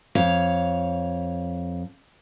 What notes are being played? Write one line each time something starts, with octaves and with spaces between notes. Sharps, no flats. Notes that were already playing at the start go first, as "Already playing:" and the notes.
F2 C#5 F5